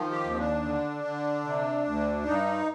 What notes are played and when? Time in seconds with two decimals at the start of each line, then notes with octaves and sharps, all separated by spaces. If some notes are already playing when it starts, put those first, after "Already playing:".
Already playing: D#3 F3
0.11 G4
0.24 D#2
0.30 C4
0.37 D4
0.64 D3
1.04 D3
1.44 C3
1.85 D2
2.25 G2 D#4